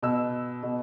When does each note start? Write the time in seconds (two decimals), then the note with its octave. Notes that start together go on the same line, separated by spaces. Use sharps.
0.03 B2 E6
0.63 B2